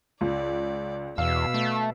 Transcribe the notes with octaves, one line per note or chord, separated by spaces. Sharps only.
C#2 D5
E2 B2 F5 E6
A3